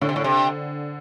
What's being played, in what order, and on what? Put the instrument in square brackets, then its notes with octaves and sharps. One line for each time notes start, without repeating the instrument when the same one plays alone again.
[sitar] A2 [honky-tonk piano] D3
[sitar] C3
A2
C3